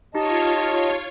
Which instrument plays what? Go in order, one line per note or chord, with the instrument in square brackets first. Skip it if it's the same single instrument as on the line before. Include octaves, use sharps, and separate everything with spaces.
[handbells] D#4 G4 A#6 [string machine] F4 C#5 [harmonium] D#5 A5